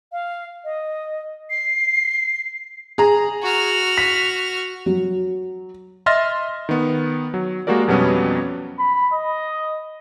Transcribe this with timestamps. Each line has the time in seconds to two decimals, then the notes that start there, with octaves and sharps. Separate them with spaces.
0.12 F5
0.64 D#5
1.50 C7
2.98 G#4 A#5
3.43 F#4 F6
3.97 B6
4.86 F#3
6.06 D#5 E5 C6 F6 A6 A#6
6.69 D#3 B3
7.34 F#3
7.67 G#3 A#3 F#4 G4 A#4 D5
7.88 F2 B2 F#3 G3 B3 C#4
8.79 B5
9.13 D#5